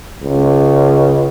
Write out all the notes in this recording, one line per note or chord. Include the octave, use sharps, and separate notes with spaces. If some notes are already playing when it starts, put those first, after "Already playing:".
C#2